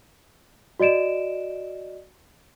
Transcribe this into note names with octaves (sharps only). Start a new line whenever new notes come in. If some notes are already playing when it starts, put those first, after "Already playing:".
F#4 D5 D#5 D7 E7